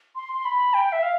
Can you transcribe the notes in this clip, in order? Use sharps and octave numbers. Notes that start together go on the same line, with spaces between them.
C6
C6
B5
G5
E5
F5